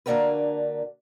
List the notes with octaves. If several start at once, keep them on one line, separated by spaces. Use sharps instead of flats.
D3 A#3 D4 F#4 A#4 B4